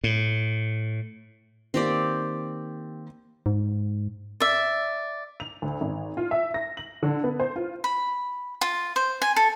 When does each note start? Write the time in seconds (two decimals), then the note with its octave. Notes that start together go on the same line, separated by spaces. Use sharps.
0.04 A2
1.74 D#3 A#3 C4 G4 D5
3.46 G#2
4.40 D5 E5
5.40 F7
5.62 D2
5.81 G#1
6.17 F4
6.31 E5
6.54 A#6
6.77 F#7
7.03 D3
7.24 B3
7.40 C5
7.56 F4
7.84 B5
8.61 F4
8.96 C5
9.22 G#5
9.36 A4